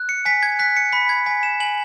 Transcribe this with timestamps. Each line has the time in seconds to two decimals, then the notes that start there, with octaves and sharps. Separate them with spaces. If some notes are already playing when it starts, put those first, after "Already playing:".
Already playing: F#6
0.09 C#7
0.25 G#5 B6
0.43 G#6
0.59 F#6 B6
0.77 C#7
0.92 B5 B6
1.09 G#6
1.26 G#5 B6
1.43 E7
1.60 G#5 F#7